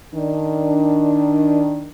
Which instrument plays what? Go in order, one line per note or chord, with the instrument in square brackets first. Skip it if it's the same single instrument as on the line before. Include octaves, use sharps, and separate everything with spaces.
[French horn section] D#3 D4